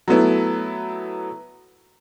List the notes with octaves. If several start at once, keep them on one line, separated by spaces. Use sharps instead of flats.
F#3 A3 B3 E4